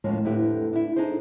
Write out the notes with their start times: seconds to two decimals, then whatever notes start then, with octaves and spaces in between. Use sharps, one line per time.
0.04 D#2 A2 F3 G#3 A#3 C#4
0.24 F2 A2 D3 E4 G4 B4
0.73 D4 E4
0.96 D4 D#4 G#4 A4 C5